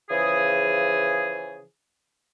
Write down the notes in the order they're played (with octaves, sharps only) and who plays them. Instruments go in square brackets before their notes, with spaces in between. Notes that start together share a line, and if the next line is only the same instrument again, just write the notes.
[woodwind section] C#3 E3 F3 G#4